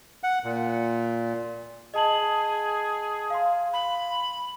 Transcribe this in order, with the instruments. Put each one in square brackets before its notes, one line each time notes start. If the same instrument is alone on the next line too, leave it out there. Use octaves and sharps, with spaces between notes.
[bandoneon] F#5
A#2
[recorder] G#4 [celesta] D#5 A5 F#7
[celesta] F5 C6
[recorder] B5